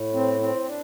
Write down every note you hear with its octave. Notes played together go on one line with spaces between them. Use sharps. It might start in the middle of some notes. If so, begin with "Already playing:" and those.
Already playing: A2
C4
C4
D4